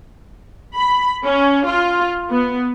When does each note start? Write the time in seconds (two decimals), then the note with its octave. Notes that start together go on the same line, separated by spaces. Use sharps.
0.75 B5
1.24 C#4
1.67 F4
2.30 B3